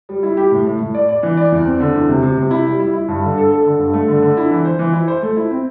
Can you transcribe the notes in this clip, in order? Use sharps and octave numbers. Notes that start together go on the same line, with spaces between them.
G3
E4
G4
A2
A2
A2
D5
D5
E3
D5
E2
C4
D3
E2
C3
C3
C3
E4
G3
E4
E4
G2
D3
A4
A4
D3
G2
A3
D3
D3
E4
E3
C5
E3
E4
C5
A3
E4
C4